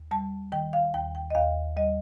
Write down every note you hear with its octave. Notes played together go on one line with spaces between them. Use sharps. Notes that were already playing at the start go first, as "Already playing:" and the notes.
Already playing: D#2
G3 A5
D#3 G5
F5
D#2 G5
G5
D#5
D#2 F5
G3 D#5